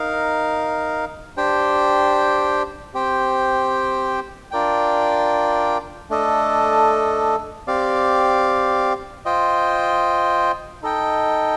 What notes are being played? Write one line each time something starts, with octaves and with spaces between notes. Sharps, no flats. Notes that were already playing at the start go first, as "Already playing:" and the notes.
Already playing: D#4 A#4 F5
D4 G4 C5 G5
C4 G4 C5 G5
D4 F4 A#4 D5 G5
A3 D4 A4 D#5
C4 G4 D5 F5
F4 C5 D#5 G5
D#4 A4 D#5 G5